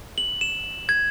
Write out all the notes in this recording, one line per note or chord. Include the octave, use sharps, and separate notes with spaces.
F#7
E7
G#6